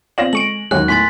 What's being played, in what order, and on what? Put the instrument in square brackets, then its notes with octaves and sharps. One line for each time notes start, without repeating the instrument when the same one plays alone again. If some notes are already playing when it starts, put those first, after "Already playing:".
[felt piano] C4 A#6 E7 [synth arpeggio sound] F4 C#5 D5 [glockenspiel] F#7
[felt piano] G#3 [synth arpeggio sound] A4 C#6 D7 [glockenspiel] F#7
[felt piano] D#2 F#3 [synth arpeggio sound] G#3 C#4 G4 [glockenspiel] F#6
[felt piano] A2 [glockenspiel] G#5 C6 A6 [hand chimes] B6